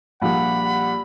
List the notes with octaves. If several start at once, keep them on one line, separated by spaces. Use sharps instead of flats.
A#1 G3 G4 F#5 B5
F#5